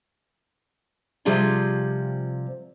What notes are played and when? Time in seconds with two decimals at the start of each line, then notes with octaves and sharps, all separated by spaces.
1.25 C3 F3 G3 F4 G#4 A4